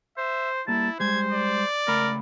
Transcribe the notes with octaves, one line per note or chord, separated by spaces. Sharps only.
C5 E5
G3 A#3 E4 A5
G3 G#3 C5 G#6
D5
C#2 A3 A#4 B5